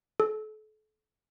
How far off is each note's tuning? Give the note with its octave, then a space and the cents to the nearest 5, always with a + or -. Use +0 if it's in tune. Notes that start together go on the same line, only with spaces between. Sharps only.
A4 -35